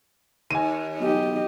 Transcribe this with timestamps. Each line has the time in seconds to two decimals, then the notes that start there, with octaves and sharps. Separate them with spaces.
0.51 D#2 G#5 D#7
1.00 B1 G4 D#5